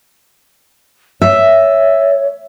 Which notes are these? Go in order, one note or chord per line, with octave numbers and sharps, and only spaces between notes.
C#5 E5